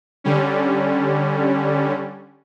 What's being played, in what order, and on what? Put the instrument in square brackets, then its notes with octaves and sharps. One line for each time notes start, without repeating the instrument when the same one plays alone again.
[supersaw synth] D3 G3 C#4